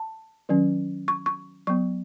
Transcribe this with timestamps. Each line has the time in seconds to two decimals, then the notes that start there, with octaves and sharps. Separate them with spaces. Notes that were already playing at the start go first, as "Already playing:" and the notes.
Already playing: A5
0.49 D#3 F#3 C#4
1.08 C#6
1.26 C#6
1.67 F#3 B3 C#6